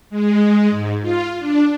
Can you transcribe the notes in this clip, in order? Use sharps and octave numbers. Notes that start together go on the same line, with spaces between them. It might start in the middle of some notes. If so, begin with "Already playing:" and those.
G#3
G#2
F4
D4